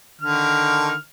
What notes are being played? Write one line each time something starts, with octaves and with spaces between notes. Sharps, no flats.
D3 D#3 F6